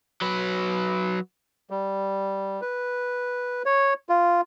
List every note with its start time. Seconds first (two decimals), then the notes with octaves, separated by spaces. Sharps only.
0.21 F#3 B4
1.70 G3
2.62 B4
3.66 C#5
4.09 F4